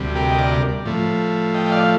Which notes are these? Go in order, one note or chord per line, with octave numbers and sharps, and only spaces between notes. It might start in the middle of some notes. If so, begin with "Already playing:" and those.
Already playing: D2 C3 G3
G4 A#4
D#5
A#4 D5
A2 F3 A3
D#5 G5
G5
D5 F5